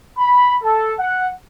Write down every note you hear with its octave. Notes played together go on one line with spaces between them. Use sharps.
B5
A4
F#5